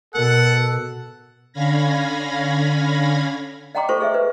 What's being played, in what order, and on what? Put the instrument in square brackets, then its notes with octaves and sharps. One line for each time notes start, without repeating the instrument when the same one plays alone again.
[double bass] B2 [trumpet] A4 [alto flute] A#4 [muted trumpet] F#5
[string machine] D3 C#4 F5 B5 G#6 A#6
[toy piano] D#5 F#5 G5 A#5 C6 D6
F4 A4 C5 C6 C#6
G#4 D#5 E5
B4